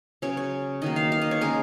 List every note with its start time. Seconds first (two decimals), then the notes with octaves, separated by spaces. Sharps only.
0.22 C#3 F#3 C#4 C#5
0.37 C#5
0.82 D#3 F#3 A#3 D#5
0.96 F5
1.12 F5
1.22 D#5
1.31 C#5
1.41 C#3 G#3 C#4 A#4